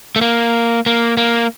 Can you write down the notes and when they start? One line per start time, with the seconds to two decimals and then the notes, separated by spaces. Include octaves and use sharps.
0.16 A3
0.21 A#3
0.86 A#3
1.17 A#3